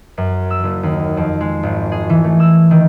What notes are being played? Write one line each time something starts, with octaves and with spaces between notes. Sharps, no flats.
F#2
E6
F#1
D#2
F2
G#3
G#1
G#4
E3
A3
E6
D#3